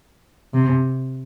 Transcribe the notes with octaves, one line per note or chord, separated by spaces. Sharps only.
C3